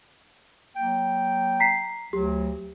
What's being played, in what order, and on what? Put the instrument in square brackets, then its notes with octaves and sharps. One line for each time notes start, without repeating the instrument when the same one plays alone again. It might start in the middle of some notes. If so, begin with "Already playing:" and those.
[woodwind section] F#3 A#3 G5
[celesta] A#5 B6 C7
[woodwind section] D2 F#3 [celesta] G4